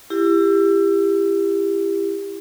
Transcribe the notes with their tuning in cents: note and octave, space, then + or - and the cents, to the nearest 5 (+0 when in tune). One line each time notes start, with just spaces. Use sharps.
E4 +30 G4 +25